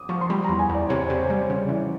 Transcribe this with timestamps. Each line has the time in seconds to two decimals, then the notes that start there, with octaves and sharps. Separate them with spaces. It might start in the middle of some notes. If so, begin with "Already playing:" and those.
Already playing: D6 D#6
0.09 F3 C#6
0.21 C6
0.29 G3 B5
0.44 E2 A#5
0.59 G#5
0.69 E2
0.74 D5
0.89 C3 C#5
1.05 C5
1.10 C3
1.19 C5
1.30 G3 D5
1.50 C#3
1.69 E3